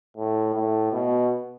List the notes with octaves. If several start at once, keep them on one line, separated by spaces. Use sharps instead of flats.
A2
A2
B2